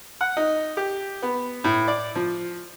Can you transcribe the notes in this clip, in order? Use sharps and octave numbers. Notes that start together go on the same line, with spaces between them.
F#5
D#4
G4
B3
A2
D5
F3